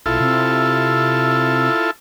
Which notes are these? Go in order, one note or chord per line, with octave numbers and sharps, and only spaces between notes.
B1 E4 F4 A4
C3